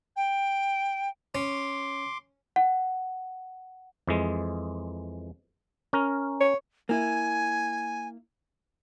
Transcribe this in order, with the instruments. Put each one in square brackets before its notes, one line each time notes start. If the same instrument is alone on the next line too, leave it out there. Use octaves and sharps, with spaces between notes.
[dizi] G5
[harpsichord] C#4 [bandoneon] C6 D6
[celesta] F#5
[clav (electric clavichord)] F2 E3 G#3
C#4 A#4
[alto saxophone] C#5
[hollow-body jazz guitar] A#3 E4 [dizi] G#5